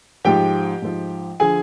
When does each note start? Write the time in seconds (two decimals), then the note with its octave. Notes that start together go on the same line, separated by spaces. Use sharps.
0.25 G#2 F3 G4 G5
0.82 G#2 F3
1.40 D3 F3 G#4 G#5